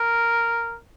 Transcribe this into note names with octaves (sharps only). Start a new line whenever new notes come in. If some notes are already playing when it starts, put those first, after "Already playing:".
Already playing: A#4